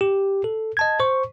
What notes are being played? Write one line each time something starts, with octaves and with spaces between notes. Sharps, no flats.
G4
A4
D#5 A5 G#6
C5 C#6